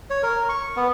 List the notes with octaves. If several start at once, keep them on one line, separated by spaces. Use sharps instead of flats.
C#5
A#4
C#6
B3